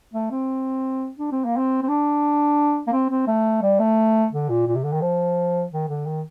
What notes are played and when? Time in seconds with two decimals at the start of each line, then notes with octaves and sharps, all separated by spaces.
0.14 A3
0.31 C4
1.19 D4
1.32 C4
1.45 A#3
1.57 C4
1.83 C4
1.88 D4
2.87 A#3
2.92 C4
3.10 C4
3.27 A3
3.62 G3
3.80 A3
4.33 D3
4.49 A#2
4.67 A#2
4.75 C3
4.84 D3
4.93 D#3
5.01 F3
5.71 D#3
5.89 D3
6.07 D#3